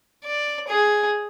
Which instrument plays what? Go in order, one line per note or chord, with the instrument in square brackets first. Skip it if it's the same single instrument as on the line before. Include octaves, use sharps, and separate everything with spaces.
[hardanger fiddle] D5
G#4